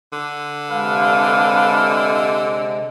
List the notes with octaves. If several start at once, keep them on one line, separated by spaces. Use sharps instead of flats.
D3
C3 G#3 D4 B4 F5